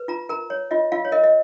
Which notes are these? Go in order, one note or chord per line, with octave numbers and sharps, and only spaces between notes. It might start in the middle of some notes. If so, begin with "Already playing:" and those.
Already playing: B4
F4 A#5
A#4 A#5
C#5
F4 D#5
F4 F5
C#5
A#4 D#5
D#5